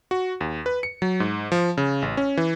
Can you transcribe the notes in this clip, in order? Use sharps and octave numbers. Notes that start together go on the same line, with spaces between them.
F#4
D#2
B4
C#7
F#3
G#2
F3
C#3
A1
C#4
E3